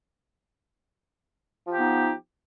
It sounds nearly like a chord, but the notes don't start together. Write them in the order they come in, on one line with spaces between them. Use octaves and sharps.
F3 G4 B3 D#4